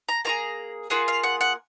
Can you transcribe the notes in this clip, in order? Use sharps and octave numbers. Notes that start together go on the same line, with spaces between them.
A#5
A#3 F4 G#4 A#5
A#3 F4 G#4 F#5
F5
F#5
F#5